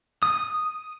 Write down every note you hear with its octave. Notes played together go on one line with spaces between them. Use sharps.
D#6